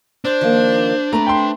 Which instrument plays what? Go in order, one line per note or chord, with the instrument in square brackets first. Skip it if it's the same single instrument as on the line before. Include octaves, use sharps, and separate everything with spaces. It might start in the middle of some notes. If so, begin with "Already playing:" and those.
[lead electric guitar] D4 [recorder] C5
[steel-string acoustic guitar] D#3 F3 A#3
[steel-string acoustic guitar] A3 C4 B4 [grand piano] A#5
[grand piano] G5 C6